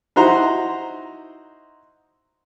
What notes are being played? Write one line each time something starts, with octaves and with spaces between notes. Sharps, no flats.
D#4 E4 F#4 C5 A#5 C6